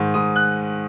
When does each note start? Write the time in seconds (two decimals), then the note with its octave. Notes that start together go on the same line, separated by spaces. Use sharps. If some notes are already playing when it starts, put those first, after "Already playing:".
Already playing: G#2 D#3
0.14 G#2 D#6
0.36 F#6